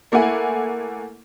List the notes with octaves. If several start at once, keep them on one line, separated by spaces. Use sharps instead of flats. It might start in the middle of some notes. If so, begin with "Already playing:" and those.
A3 A#3 E4 F#5 G#5